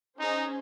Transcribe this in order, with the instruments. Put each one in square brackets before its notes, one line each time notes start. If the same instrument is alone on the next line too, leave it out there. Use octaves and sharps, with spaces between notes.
[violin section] C#4 G#4 C5 [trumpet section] D#4